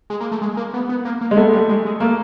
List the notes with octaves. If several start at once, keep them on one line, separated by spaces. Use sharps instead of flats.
G#3
A#3
A3
G#3
A#3
B3
B3
A#3
A#3
G#3
A3 B3
G3
G#3
G#3
A3 A#3